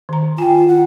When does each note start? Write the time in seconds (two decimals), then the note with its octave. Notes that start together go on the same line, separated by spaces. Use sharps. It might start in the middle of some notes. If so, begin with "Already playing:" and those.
0.09 D#3 A#5
0.38 F4 G5 G#5
0.68 F#5